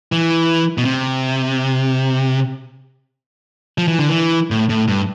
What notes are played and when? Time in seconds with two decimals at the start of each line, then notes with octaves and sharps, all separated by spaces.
0.12 E3
0.78 B2
0.85 C3
3.78 F3
3.88 E3
3.99 D3
4.09 E3
4.51 A2
4.69 A2
4.88 G2